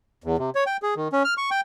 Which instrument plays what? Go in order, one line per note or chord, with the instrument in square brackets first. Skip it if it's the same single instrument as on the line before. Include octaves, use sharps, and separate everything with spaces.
[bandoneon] E2
C3
C#5
G5
G#4
D#3
C#4
F6
C#6
G5